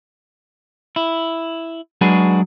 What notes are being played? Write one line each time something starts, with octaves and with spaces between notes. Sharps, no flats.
E4
F#3 G#3 D4 F#4 G#4 B4